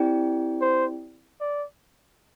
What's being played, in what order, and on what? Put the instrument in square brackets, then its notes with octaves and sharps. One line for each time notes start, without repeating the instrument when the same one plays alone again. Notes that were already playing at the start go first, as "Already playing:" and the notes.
Already playing: [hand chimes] C4 E4 G4 D5 G5
[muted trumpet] C5
D5